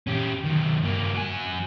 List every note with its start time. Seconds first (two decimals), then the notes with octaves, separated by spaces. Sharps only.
0.07 C#4 G4
0.45 D#3 F#3
0.82 G2 A#3
1.14 F#3 G#5